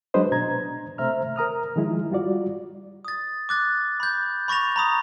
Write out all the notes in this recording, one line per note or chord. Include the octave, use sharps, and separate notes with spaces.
F#3 G#3 D4 B4 C5 D#5
B2 D4 A#5 G#6
C3 A3 C5 E5 A#5 F6
A#4 A#5 D#6 F6
D#3 F3 G#3 E4
G3 F4 F#4 D5
D#6 A6
D6 F#6 A6
B5 G6
B5 C#6 A6 A#6 F7
A#5 B5 D#6